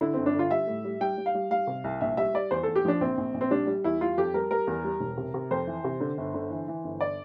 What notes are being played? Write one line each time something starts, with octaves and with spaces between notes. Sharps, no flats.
D3 E4
G1 C4
D4
D3 F4
G3 E5
A2
G3
G3 G5
G3
F5
G3
G3 F5
C3
C2
A#1 E5
G3 E5
G3 D5
E2 C5
E2 A4
G4
F3 D4
A#1 C4
A#1
A#1
C4
G3 D4
G3
E2 E4
G3 F4
F2 G4
G3 A#4
G3 A#4
E2
G3
E1
C3
C3
F2 C5
E3
C3
D3
G1
D3
E3
E3
G1
D5